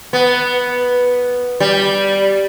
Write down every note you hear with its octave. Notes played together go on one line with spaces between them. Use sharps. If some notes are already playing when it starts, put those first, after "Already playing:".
B3
G3